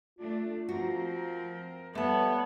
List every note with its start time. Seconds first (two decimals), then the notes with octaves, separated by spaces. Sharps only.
0.19 A3 D4 F4
0.69 F3 C4 F#4 A#4
1.95 G3 A3 B3 C#5 A5